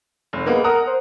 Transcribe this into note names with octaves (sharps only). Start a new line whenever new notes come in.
F1
G#3 A#3 B3
A#4 F#5 A#5 D#6
C5